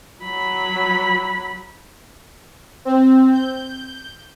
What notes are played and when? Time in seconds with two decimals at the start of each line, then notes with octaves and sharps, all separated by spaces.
0.23 F#3 B5
2.85 C4
3.33 G6